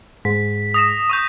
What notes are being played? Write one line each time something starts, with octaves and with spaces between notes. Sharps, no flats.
G#2 B6
D#6 A#6 E7
C#6 D#6 G6